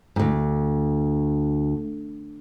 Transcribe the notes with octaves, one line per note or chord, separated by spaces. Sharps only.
D2 G#2